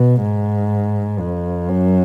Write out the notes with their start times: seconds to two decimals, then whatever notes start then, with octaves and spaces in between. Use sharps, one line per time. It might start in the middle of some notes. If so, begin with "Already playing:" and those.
Already playing: B2
0.22 G#2
1.19 F2
1.69 F#2